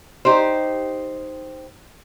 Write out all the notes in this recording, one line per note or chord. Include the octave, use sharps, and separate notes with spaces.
D#4 G4 C5